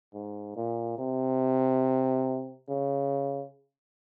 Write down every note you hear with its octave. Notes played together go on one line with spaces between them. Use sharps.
G#2
A#2
C3
C#3